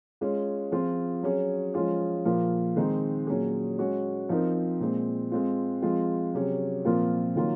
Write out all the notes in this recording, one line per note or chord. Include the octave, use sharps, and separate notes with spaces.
G#3 C#4 F4 G#4
F3 C4 F4 G#4
F#3 C#4 G#4
F3 G#3 C#4 F4 G#4
A#2 F3 A#3 F4
D#3 G#3 C4 D#4
A#2 F#3 C#4 G#4
G#3 C#4 F#4
F3 C4 D#4 A#4
A#2 G#3 C4
G#3 C4 F4
F3 G#3 C4 F4
C3 F#3 C#4 G#4
A#2 F3 C4 F4 A#4
D#3 F#3 A#3 F4